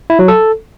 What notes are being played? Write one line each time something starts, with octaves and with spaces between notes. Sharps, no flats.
E4
F#3
A4